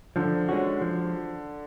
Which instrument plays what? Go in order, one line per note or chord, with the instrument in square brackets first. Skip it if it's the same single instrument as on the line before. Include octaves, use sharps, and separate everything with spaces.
[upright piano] D3 [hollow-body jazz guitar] F3
[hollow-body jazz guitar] G#3 C#4 F#4
F3